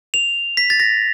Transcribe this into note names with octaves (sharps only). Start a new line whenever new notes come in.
F7
B6
A6
A#6